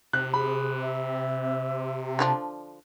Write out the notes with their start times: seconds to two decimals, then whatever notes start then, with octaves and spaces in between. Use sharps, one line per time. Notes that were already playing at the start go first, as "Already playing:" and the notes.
0.13 C3 F#6
0.34 G#4 B5
0.81 E5
2.19 D3 F3 D4